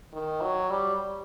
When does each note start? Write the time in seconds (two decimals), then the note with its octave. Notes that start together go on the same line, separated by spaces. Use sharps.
0.13 D#3
0.42 F#3
0.70 G3